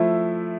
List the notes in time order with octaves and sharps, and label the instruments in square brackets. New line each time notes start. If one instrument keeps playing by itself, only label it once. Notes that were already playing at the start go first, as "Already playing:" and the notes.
Already playing: [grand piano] F3 A3 E4